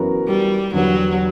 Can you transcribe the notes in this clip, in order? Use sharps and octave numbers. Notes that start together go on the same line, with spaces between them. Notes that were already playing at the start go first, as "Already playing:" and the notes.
Already playing: F#2 E3 B3 F#4 A#4
G3
E2 D3 F#3 G3 B3